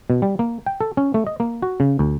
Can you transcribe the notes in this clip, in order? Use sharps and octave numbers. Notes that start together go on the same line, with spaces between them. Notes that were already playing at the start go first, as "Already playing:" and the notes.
B2
G3
A#3
G5
A4
C#4
A3
D#5
A#3
F#4
C#3
D2